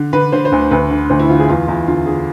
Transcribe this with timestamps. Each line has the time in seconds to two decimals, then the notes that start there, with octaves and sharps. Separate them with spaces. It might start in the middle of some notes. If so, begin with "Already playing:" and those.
Already playing: D3
0.13 D3 B4
0.32 D3 C5
0.45 C5
0.52 D2
0.71 D2 B4
0.91 D3
1.10 D2 C5
1.19 E4
1.29 D3 F4
1.39 G#4
1.48 E2 F4
1.68 E2 E4
1.87 D3 F4
2.06 D3 G#4